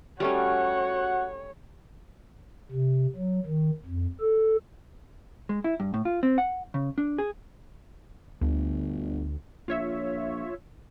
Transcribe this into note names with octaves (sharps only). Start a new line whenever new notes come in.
G3 A3 C#4 F#4 C#5 F#5
C3
F#3
D#3
F2
A4
G#3
E4
G2
A2
F4
C4
F#5
C#3
D4
G#4
G1 D2
A#1 F4 C#5 E5